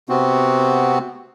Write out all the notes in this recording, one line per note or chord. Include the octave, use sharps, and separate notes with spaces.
C3 B3 C4 F#4